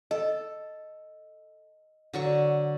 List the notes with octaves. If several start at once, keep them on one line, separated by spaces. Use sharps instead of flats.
A4 D#5
D3 F#3 C#6